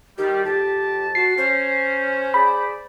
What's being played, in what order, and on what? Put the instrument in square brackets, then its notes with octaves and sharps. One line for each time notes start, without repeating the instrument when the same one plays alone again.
[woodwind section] D#3 G3 [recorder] G4
[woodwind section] F2 A5 [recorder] G4
[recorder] F#4 [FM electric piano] C7
[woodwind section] C#4 [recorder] C5
[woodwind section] G#4 D5 [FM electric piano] B5